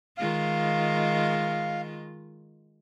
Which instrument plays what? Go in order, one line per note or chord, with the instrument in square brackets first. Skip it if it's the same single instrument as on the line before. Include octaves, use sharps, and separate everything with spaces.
[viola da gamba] D#3 G#3 F4 [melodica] F5